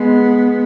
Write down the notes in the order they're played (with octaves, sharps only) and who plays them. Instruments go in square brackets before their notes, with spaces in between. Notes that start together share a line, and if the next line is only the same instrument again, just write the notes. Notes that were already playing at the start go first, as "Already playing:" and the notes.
Already playing: [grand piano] G#3 [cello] B3